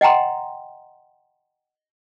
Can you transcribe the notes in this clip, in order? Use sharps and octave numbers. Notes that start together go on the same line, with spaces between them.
D#5 F#5 G5 A#5 C6